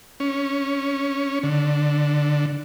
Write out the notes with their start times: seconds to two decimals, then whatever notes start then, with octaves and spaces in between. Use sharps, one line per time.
0.20 C#4
1.43 D3